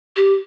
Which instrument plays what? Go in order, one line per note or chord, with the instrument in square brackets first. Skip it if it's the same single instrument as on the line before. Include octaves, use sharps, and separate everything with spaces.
[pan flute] G4